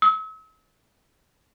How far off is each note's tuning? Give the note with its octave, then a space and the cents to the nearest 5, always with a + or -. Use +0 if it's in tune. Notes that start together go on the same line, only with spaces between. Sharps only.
E6 -40